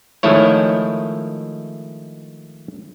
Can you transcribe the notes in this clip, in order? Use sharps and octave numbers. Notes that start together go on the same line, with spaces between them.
D#3 F3 G#3 A3 E4 C#5